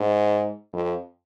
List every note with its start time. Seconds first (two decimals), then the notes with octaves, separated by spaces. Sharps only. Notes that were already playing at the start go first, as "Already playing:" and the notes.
Already playing: G#2
0.73 F2